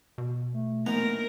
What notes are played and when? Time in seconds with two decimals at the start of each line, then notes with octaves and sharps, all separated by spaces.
0.18 B2
0.53 A3
0.86 A#1 E3 B3 D#4 A#4 A#5